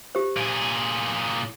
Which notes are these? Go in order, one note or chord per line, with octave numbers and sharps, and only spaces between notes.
G4 C5
A#2 G#4